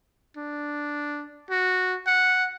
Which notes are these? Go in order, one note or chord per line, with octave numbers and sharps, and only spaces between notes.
D4
F#4
F#5